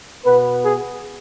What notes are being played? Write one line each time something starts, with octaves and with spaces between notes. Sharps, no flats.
B2 B3 B4
G#4